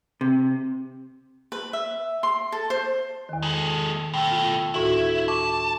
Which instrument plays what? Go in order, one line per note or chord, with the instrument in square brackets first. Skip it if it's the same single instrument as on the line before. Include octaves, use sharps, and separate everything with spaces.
[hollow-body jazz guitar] C3
[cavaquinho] B4
E5
C6
A4
C5
[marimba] E2 D#3
[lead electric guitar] G#3 A4
[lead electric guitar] B2 A3 [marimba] G5
[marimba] F4
[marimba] D2 A2 F#4 [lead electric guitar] E4
[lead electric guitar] A5 [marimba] C#6 D6